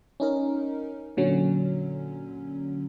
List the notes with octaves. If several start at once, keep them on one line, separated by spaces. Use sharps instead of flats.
C#4 D#4 A#4
A#2 D3 F#3 C#4